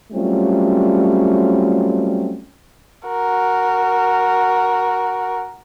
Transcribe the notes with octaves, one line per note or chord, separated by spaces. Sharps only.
F#3 G3 A3 C4 C#4 F4
F#4 A#4